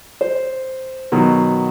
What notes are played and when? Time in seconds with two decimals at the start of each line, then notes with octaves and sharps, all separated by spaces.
0.21 C5
1.12 B2 D#3 F#3